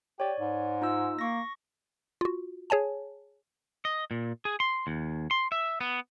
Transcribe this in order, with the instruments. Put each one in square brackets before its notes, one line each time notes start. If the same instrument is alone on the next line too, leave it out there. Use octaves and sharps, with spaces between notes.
[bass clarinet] G4 [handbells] C#5 D5
[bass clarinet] G#2
[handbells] D#4 F4 E6
[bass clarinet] A#3 [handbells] C#6 A#6
[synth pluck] F4 F#4
G#4 C#5 G#5 A5
[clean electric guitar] D#5
A#2
G#4
C6
D#2
C6
E5
B3